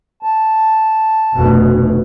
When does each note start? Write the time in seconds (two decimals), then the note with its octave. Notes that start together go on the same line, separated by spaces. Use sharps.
0.23 A5
1.34 F1 D2 B2